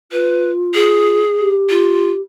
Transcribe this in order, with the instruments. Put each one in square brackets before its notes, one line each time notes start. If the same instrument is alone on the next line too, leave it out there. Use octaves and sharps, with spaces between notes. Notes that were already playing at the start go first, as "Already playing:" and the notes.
[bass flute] F4 [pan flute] B4
[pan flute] G#4
[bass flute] G4
[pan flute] F4